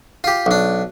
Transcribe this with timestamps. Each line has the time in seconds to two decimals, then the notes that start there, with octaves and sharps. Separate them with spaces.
0.24 F4 G4
0.46 B1 D4